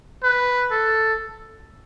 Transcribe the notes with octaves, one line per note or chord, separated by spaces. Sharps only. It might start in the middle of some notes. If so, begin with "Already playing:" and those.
B4
A4